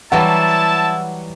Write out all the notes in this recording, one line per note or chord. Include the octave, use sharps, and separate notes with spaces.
E3 F#3 G3 E4 F#5 A5